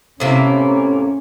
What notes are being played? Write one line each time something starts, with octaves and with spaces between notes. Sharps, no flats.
A2 C3 A#3 C#4